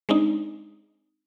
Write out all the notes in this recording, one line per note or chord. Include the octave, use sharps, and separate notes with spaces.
G#3 C4 D4 D#4